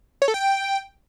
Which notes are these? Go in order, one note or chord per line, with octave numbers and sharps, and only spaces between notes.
C#5
A4
G5